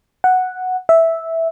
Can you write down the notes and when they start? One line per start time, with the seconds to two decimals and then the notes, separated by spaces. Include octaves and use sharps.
0.24 F#5
0.89 E5